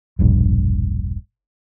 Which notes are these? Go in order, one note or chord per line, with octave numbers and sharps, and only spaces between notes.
E1 A#1 G2